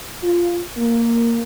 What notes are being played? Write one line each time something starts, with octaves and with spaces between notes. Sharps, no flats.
F4
A#3